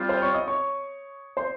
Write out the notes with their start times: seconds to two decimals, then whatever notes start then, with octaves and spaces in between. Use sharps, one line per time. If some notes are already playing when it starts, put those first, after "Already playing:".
Already playing: G3 C4 F4
0.09 C5 C6
0.22 C#5 C#6
0.34 D#5 D#6
0.48 C#5 C#6
1.37 C5 C6